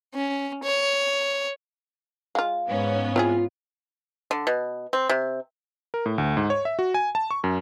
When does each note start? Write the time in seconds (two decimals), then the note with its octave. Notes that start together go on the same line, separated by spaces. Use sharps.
0.14 C#4
0.63 C#5
2.35 G#3 F4 F5
2.68 G#2 B3 C#4
3.16 C4 E4 F4 G#4
4.31 D3
4.47 B2
4.93 C4
5.09 C3
5.94 A#4
6.06 A2
6.18 D2
6.37 G#2
6.50 C#5
6.65 E5
6.79 F#4
6.94 G#5
7.15 A5
7.31 C#6
7.44 F#2